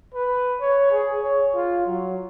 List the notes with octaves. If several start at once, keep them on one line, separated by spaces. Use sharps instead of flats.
B4
C#5
G#4
C#5
F4
F#3